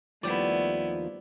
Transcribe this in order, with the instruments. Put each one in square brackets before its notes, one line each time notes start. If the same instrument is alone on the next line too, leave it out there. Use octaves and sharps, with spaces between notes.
[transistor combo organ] D#2 F3 [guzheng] G3 D5 [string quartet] A3 B3 E4